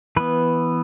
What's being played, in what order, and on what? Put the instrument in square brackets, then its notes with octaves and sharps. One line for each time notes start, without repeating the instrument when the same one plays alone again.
[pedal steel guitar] E3 B3 B4